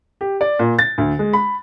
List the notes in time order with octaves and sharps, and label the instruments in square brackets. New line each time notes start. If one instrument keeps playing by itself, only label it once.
[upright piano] G4
D5
A#2
A6
D2
G#3
B5